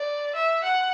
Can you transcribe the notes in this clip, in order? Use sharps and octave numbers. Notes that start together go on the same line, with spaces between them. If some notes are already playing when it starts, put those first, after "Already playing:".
Already playing: D5
E5
F#5